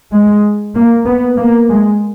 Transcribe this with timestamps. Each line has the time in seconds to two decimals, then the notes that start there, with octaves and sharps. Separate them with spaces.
0.13 G#3
0.75 A#3
1.06 B3
1.38 A#3
1.69 G#3